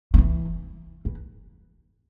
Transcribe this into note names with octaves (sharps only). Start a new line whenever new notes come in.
F#3
E3
E3